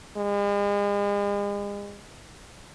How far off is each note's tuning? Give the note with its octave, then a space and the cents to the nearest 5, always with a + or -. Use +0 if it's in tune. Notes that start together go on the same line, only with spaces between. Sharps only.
G#3 -40